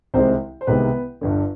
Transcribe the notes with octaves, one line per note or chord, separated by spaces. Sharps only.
C2 C3 D#3 G#3 C4 C5
C5
C2 C3 D#3 G#3 B3 B4
G1 G2 D3